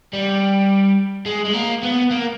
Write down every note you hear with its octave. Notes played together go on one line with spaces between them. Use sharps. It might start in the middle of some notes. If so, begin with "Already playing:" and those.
G3
G#3
G#3
A#3
B3
A#3